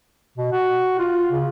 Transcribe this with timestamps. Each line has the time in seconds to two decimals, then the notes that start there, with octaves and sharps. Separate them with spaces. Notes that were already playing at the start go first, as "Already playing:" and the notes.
0.38 B2
0.52 F#4
0.99 F4
1.30 C#3